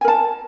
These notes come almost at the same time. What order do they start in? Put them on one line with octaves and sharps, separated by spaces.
G#5 A#4 A5